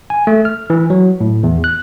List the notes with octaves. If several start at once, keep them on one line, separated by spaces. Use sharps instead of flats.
G#5
A3
F6
E3
F#3
A2
E2
F#6